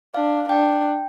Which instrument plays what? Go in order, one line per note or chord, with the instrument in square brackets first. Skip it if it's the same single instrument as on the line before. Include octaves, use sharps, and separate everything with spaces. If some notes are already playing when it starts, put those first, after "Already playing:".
[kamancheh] D4 [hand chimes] F5
[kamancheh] D4 [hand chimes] G5